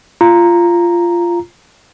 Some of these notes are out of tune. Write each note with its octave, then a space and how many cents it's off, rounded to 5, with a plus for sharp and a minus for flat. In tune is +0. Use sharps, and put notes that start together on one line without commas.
F4 -15 A#5 +0